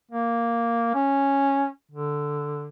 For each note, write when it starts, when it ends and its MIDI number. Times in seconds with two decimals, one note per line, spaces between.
0.11 0.91 58
0.94 1.67 61
1.91 2.68 50